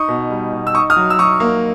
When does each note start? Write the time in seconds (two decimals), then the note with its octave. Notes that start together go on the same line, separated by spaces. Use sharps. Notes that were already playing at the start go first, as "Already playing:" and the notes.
Already playing: D#4 C#6 D#6
0.08 B2
0.30 G3
0.52 B2
0.67 E6
0.74 D#4 C#6 D#6
0.90 D#6 F6
0.96 F#3
1.10 E6
1.19 F#3 C#6 D#6
1.40 A#3